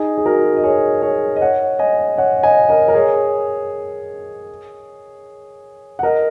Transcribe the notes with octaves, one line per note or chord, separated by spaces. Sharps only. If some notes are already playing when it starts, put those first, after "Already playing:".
Already playing: D#4 G#4
G#4
F#4 A#4
D#5
G#4 C#5
G#4 C#5
D#5
C#5 F#5
D#5 G#5
C#5 F#5
D#5 G#5
A#4 D#5
A#4
G#4 C#5
F#5
A#4 D#5